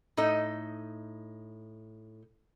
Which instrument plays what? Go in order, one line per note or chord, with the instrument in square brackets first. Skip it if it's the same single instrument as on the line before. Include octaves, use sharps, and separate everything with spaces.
[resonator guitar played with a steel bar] A2 D#4 A4 D#5